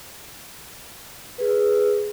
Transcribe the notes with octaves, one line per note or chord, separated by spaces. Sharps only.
G#4 B4